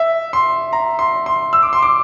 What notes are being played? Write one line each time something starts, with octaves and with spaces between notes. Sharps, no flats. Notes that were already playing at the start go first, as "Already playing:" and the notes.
Already playing: E5
C6
A#5
C6
C6
E6
D6
C6
D6